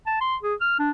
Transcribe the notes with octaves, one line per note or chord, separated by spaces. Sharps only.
A5
C6
G#4
F6
D4